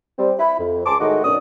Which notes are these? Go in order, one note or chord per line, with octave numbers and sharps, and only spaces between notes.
G3 C4
E4 B5
F2
C#2 G#5 A5 C6 D6
A2 D#3 G#3 D#4 F#4 D#5
F#2 B2 C#4 D4 D5 D#6